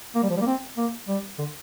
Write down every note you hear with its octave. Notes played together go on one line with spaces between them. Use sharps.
A#3
G3
F3
G3
A#3
C4
A#3
G3
D3